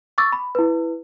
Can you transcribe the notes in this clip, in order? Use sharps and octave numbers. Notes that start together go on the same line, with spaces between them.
C#6 D6 E6 A6
B5
E4 B4